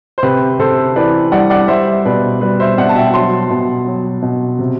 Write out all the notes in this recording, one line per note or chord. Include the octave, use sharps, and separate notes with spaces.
C5
C3 G4 B4
C3 A4 C5
E3 B4 D5
G3 D5 F#5
D5 F#5
G3 C5 E5
B2 B4 D5
G3 B4 D5
C5 E5
B2 D5 F#5
A5
E5 G5
F#3 A5 C6
B2
F#3
B2
C3